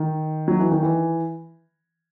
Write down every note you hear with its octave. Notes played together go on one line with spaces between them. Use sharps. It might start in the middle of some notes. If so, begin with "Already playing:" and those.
Already playing: D#3
F#3
E3
D#3
E3